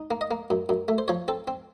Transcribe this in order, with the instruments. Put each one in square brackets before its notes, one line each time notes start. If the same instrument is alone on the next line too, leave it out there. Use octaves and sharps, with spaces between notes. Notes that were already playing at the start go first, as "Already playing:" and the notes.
Already playing: [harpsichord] D#4
A#3
D#5
A#3
F#2
F#2
A3
C5
F3 C#5
C4 A4
C4